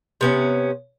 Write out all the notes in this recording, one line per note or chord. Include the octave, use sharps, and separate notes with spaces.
C3 B3 C#4